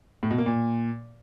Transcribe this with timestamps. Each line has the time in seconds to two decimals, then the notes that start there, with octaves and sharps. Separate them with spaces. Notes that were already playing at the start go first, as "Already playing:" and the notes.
0.23 A2
0.31 B2
0.38 A#3
0.46 A#2